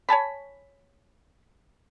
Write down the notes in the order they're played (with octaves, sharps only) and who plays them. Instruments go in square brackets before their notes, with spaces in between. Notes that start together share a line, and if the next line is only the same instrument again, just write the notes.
[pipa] C#5 G#5 A5 B5